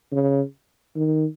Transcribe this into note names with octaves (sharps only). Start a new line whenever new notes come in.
C#3
D#3